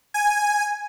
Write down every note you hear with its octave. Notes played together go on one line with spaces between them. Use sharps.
G#5